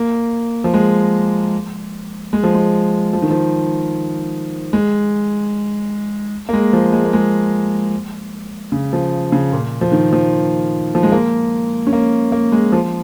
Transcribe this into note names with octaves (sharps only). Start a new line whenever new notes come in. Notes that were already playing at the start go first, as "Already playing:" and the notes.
Already playing: A#3
F3
G#3
G#3
F3
G#3
F3
D#3
F3
G#3
A#3
G#3
F3
G#3
A#3
G#3
C#3
F3
C#3
A#2
F3
D#3
F3
F3
G#3
A#3
C#4
A#3
A#3
G#3
F3